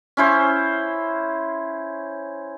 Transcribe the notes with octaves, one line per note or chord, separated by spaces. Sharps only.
C#4 E4 C5